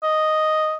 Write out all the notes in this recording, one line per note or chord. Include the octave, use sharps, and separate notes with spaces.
D#5